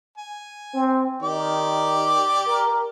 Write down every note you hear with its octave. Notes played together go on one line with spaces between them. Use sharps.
G#5
C4
D#3 G4 D5 D6
A#4